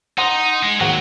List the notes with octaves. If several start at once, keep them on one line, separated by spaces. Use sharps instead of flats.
D#4 F#5 C6 D#6
G#3
D#2 G#2 F#3 F#5